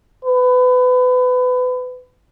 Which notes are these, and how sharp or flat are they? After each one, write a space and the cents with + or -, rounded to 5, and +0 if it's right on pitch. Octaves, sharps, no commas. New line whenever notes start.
B4 +25